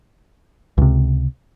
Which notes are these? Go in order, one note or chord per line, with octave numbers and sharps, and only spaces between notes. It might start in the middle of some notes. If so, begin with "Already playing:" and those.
C#2 C3